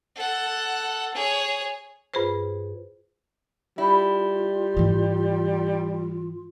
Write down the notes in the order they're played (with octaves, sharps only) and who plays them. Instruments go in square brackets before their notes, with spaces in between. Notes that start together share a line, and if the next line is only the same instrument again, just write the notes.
[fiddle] A4 F#5
G#4 C#5
[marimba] G2 F4 G#4 B4 C5
[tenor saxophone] G3 [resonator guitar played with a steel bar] E4 [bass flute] F4
[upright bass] G#2 E3